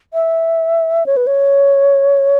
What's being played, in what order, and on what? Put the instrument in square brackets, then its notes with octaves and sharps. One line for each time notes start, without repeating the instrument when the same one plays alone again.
[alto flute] E5
C#5
B4
C#5